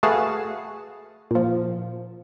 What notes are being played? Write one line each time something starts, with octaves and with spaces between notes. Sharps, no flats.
A3 F#4 G#4 B4 F5 A5
A#2 F3